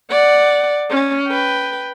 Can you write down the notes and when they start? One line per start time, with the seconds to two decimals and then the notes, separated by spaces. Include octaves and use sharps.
0.10 D5 F#5
0.90 C#4
1.28 B4 G5